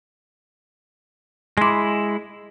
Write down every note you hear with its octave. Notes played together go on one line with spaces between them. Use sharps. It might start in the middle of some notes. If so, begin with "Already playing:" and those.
G#3 E4 C6 D6